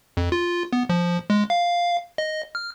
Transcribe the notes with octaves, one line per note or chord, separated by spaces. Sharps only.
F2
F4
B3
F3
G#3
F5
D#5
F6